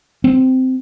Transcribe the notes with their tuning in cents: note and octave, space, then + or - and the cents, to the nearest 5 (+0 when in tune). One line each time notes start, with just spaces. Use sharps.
C4 -15